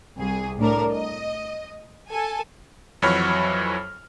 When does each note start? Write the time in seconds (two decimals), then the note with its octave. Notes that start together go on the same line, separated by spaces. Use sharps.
0.18 C2 G#4
0.58 A2 D4 A#4
0.92 D#5
2.10 A4 G#5
3.02 F2 E3 F#3 C#5 B5 F6